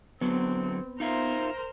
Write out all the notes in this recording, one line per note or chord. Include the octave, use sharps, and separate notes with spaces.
D3 F#3 B3 C4
D#4 F4 A#4 C5 E5